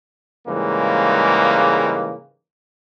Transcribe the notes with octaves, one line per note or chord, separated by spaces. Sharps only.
G#2 C#3 E3 G3 G#3 A#3